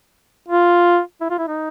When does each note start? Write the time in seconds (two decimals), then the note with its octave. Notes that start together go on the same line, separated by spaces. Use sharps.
0.48 F4
1.21 E4
1.30 F4
1.38 E4
1.48 D#4